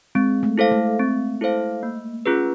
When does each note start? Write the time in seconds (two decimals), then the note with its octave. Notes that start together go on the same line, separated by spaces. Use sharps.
0.15 G#3 C4
0.43 A3
0.58 E4 A4 C5 F5
0.71 A3
0.99 C4
1.41 E4 A4 C5 F5
1.83 A#3
2.26 C#4 F4 G#4 B4